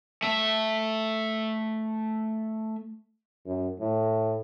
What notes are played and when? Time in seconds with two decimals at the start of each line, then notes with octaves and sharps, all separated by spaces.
0.23 A3 E5
3.46 F#2
3.79 A2